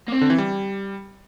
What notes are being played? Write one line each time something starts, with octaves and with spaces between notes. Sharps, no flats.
A#3
C4
D3
E3
G3